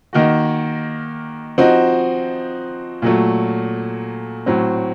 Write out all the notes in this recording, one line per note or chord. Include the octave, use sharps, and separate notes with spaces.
D#3 A#3 D#4 F#4
F3 C4 D#4 F#4
A#2 F#3 A3
A2 F#3 C4